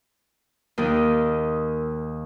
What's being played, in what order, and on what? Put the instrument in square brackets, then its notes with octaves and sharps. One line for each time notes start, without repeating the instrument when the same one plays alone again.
[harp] D#2 D#3 [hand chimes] A#4